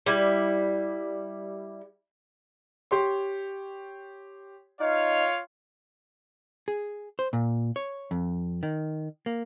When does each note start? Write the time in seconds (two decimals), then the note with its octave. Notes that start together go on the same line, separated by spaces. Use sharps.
0.06 G3 E4
2.91 G4 C#5 C6
4.80 D#4 F4 C#5 F5
6.68 G#4
7.19 C5
7.33 A#2
7.76 C#5
8.11 F2
8.63 D#3
9.26 A#3